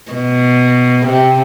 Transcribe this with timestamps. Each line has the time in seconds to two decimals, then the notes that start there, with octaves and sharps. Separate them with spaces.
0.11 B2
1.06 C3